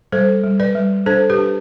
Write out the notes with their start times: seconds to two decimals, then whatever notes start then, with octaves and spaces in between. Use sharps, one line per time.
0.12 G3 A4 C5
0.44 G3
0.60 B4 D5
0.75 G3
1.06 D4 A4 C5
1.30 G4 B4
1.38 D4